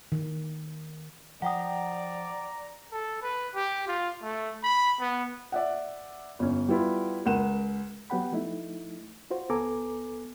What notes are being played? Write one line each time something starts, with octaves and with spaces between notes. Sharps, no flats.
D#3
F3 D5 F#5 G5 A#5 D#6
A4
B4
G4
F4
A3
B5
B3
D5 E5 F#5
G1 C#4
G3 B3 E4 F4
C#2 A#4 F#5 E7
F#3 B3 G4 F#5 G5 B5
F3 A3 D#4 E4
F4 F#4 C5
C#2 B3 A4 G#5 A#5 D6